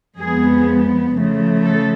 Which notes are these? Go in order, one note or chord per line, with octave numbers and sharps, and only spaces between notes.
F2 F3 G#3 B3 G#4
C#3 F3 A3
A4